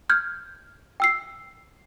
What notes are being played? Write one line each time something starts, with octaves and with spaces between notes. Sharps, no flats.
F6 G6 G#6
G5 E6 C7